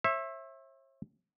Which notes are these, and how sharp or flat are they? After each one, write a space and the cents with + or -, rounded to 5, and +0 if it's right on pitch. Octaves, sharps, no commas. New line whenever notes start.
C#5 -45 E5 +0